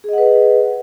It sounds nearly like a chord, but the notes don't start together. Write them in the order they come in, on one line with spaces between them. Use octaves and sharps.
G#4 D#5 F#5 B4